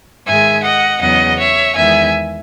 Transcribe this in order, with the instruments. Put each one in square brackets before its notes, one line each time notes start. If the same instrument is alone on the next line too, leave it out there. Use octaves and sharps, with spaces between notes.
[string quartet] G#2 D#3 G#3 E5 G#5
D#5 F#5
E2 C#3 F#3 B3 D#5 F#5
C#5 E5
E2 D#3 G#3 B3 E5 G#5